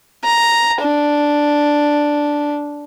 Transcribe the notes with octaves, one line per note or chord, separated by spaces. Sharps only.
A#5
D4